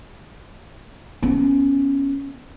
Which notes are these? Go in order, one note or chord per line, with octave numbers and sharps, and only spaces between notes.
B3 C#4